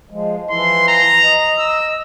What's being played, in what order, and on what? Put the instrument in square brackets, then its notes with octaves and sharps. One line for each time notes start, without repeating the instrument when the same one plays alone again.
[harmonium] F3 G#3
[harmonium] E3 F3 E4 [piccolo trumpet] C6
[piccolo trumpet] A#5
[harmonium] D#5
[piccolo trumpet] E6